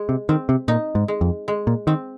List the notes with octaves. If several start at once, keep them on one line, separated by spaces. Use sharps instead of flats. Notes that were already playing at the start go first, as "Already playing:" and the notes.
Already playing: G#3
C3
D#3 C4
C3
A#2 D#4
G#2
G#3
F2
G#3
A#2
D#3 C4